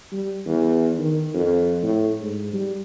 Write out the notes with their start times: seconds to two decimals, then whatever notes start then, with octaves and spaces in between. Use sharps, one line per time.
0.12 G3
0.46 E2
0.98 D#3
1.34 F2
1.83 A2
2.21 G#2
2.53 G3